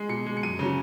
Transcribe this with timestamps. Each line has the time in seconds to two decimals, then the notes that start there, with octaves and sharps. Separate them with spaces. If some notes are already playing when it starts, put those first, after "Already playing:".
Already playing: G#3
0.09 B2 C#7
0.26 G#3
0.37 C#7
0.43 F#2 D#7
0.59 C#3 F#3